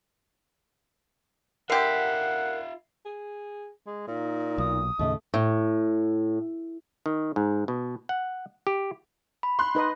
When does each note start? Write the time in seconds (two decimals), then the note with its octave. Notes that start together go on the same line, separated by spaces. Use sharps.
1.70 D3 F4 G4 A#4 E5 F#5 C7
3.06 G#4
3.87 G#3
4.08 A#2 D#4
4.58 B1 D#6
4.99 D#2 A2 C#3 A3 D#5
5.34 A2
7.06 D#3
7.36 G#2
7.68 B2
8.09 F#5
8.67 G4
9.43 B5
9.59 C6 F#6
9.75 D#4 B4 D#5